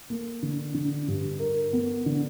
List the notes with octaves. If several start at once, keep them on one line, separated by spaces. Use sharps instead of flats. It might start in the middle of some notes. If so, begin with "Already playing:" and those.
A#3
D3
D3
G2
A#4
B3
D3